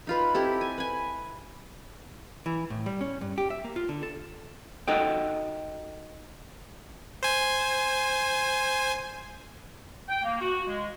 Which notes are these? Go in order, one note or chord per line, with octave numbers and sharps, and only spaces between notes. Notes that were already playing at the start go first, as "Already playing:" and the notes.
D#4 F4 B4
C4 E4 G4 A4
G#5
B4 G#5
E3
A2
G3
C#4
G2
G4
E5
A#3
F4
D3
A4
D#4 F#4 A4 D#5 F#5 G5
C5 G#5
G5
A#3
F#4
G#3